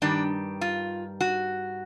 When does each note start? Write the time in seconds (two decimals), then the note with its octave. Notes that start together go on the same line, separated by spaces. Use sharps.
0.02 G2 D#3 G3 D4
0.61 F4
1.21 F#4